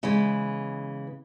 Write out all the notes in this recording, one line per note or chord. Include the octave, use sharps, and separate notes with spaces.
C#3 E3 G#3 B3